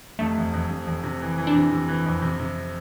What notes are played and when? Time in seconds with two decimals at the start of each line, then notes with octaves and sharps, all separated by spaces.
0.19 F1 A3
0.37 F2
0.54 F2
0.70 F1
0.87 F2
1.04 C3
1.22 E3
1.38 E3
1.47 D4
1.55 C3
1.71 C3
1.88 E3
2.06 F2
2.22 C3
2.40 C3